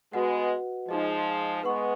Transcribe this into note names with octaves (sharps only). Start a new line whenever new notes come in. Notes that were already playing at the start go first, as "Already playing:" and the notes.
G#3 B3 F#4 B4 D#5 F#5
F3 G#3 D#4 G#4 D#5
G#3 B3 B4 F#5 C#6